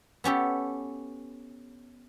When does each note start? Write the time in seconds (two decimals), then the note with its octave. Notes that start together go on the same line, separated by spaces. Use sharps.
0.24 B3 C#4 G4 A4